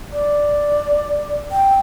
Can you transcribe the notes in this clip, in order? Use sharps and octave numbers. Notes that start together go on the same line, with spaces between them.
D5
G5